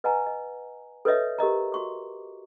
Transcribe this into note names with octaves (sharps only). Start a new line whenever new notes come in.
B4 D#5 F#5 G#5 A#5
D#5
A4 B4 C#5 D#5 E5
G4 A#4 D#5 A#5
F#4 C#6 D6